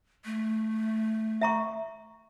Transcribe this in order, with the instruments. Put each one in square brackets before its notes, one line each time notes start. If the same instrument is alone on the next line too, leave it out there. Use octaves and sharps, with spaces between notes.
[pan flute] A3
[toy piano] E5 A#5 C#6